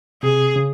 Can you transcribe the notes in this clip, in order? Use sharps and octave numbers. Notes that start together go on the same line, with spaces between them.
C3 G#4
C#3